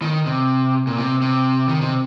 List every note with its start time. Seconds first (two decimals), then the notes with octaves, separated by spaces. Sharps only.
0.02 D#3
0.26 C3
0.87 A#2
0.98 C3
1.22 C3
1.69 D#3
1.81 C3